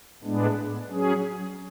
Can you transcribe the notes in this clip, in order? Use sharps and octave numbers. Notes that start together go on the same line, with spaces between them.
A2 G#3 B3 D4
F#3 C#4 G#4